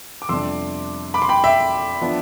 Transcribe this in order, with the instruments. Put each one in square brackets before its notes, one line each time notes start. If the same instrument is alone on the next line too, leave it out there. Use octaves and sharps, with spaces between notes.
[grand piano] D6
F2 C3 G3 B3 D4 C6 E6
B5 D6
C6
G5 B5
E5 G5
F3 B3 D4